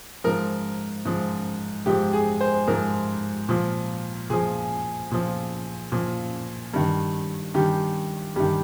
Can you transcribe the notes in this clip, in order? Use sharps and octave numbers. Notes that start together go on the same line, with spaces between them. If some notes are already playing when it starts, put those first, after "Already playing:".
G#2 F3 A#4
G#2 F3
G#2 F3 G4
G#4
C5
G#2 F3 A#4
A#2 F3
A#2 F3 G#4
A#2 F3
A#2 F3
G2 D#3
G2 D#3 G4
G2 D#3 G4